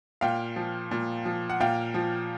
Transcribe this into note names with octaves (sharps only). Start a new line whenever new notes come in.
A#2 F5 G5
F3
A#2
F3
F#5
A#2 F5 G5
F3